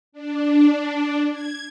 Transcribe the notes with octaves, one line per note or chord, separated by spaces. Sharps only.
D4
G#6